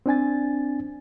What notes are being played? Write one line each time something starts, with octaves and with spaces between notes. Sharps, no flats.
C4 D4 G#5 A6